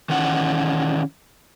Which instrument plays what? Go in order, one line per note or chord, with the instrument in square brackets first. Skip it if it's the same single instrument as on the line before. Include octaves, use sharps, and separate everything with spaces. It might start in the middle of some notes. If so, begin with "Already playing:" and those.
[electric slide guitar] D#3 E3 C#4 F#5